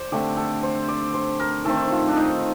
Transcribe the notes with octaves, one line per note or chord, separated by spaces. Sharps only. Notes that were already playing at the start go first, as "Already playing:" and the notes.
Already playing: C5 D5
D3 A3 C4 G4
A4
C5
D5
C5
A#4
D#3 A3 C4 A4
F4
D4
D#4